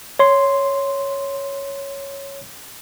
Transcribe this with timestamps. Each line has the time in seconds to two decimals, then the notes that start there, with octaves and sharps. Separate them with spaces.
0.19 C#5 C6